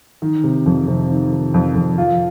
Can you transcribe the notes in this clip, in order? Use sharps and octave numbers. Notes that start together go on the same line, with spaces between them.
D#3
C3
F2
C3
D#3
D#3
F2
F2
F4